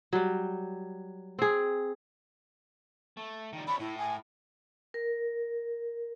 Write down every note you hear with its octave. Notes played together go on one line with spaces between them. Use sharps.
F#3 G3
C4 G#4
A3
D#3 G3
D4 C#5 B5
A2 E4
G#5
A#4